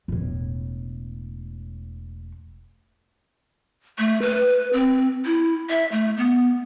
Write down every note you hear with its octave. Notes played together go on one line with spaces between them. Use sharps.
E1 A2
A3
B4
C4
E4
E5
A3
B3